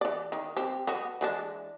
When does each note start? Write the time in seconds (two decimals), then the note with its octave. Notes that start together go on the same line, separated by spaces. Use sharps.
0.01 E3 D5
0.32 D#3
0.57 C4 G4
0.87 B3 F#4
1.21 E3 G#3 D4